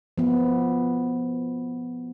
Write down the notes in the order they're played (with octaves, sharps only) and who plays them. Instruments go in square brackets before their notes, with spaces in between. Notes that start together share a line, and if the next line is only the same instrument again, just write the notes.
[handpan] F3 B3